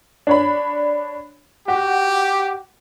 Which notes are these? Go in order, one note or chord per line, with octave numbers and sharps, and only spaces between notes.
D4 C#5 B5
F#4 G4